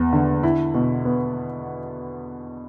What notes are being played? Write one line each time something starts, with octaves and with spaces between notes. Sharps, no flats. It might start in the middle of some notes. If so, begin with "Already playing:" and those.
Already playing: E2
D3
E4
B2
B3